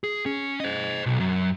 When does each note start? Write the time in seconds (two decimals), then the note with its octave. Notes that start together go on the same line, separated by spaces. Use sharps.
0.04 G#4
0.26 C#4
0.60 C5 D#5
1.06 B1
1.20 F#2